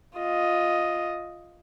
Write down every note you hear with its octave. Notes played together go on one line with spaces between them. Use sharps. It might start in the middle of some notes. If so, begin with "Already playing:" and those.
F4 D#5